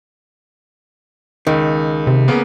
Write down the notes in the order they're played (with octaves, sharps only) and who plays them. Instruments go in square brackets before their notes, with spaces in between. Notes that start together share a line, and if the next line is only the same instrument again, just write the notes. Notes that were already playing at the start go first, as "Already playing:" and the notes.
[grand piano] C#2 [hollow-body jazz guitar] D#3
[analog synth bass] C3
[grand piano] C#3 A#3 B3